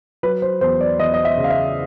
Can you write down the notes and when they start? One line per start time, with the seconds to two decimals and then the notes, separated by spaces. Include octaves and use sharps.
0.23 F#3 B4
0.42 C5
0.61 E2 C5
0.81 D5
0.99 E2 D#5
1.14 D#5
1.25 E5
1.37 C#3
1.44 F5
1.50 E5